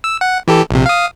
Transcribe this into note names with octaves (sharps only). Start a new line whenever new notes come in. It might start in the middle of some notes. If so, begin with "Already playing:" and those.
E6
F#5
E3 G4 A4
A#1 C3
F5 D#6